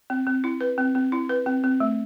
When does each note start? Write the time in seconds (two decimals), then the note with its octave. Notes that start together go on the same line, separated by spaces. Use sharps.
0.10 C4
0.27 C4
0.44 E4
0.61 B4
0.78 C4
0.95 C4
1.12 E4
1.29 B4
1.46 C4
1.64 C4
1.80 A3